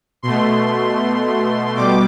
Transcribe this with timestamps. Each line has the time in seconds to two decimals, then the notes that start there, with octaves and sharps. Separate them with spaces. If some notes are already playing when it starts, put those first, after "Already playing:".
0.23 B2 A3 C6
1.76 B2 G3 D6